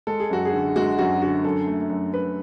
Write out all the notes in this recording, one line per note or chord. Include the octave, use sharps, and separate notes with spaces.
G#3 A4
G#4
F#2 F#4
G#4
D3
G#3 F#4
F#2 F#4
D3 F#4
F#2 A4
A3
F#2
F#2 B4